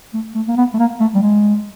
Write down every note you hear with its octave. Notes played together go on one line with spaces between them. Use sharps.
A3
A3
A#3
B3
A3
A#3
A3
G3
G#3